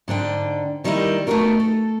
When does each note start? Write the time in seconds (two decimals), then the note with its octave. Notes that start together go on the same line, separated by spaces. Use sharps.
0.08 G#2 D3 D4 G5
0.84 D#3 G3 A#3 D#4 E4
1.27 A3 B3 D#4 F4 F#4 A#4
1.60 A4